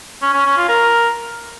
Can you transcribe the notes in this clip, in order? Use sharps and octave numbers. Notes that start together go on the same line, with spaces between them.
C#4
C#4
C#4
F4
A#4